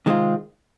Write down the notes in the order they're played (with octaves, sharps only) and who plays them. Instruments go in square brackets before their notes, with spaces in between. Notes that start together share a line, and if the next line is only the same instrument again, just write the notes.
[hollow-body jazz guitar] C3 D#3 G#3 C4 F4